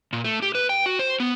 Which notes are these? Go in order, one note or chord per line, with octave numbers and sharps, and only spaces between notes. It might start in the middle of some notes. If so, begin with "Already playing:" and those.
A#2
A3
G4
B4
G5
F#4
C5
B3